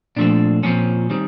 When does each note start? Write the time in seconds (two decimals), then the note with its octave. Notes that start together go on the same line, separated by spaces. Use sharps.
0.16 A#2 F3 A3 C4 D4
0.63 A#2 F3 A3 C4 C#4
1.10 D#3 G3 C4